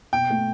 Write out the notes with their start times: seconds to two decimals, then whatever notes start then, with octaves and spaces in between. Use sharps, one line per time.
0.13 B2 G5
0.30 A3